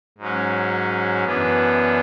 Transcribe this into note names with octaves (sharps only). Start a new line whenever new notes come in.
G#2 F#3 C#4
F#2 E3 B3 D4